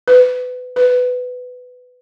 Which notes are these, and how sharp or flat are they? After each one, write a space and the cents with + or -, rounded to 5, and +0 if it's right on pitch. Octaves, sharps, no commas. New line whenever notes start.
B4 +25
B4 +15